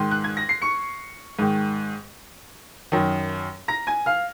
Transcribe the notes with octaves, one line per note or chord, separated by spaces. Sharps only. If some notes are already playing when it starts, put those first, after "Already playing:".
Already playing: G#2 D#3 C6
F#6
G#6
A#6
C7
C#6 C#7
G#2 D#3
F#2 D#3
A#5 A#6
G#5 G#6
F5 F6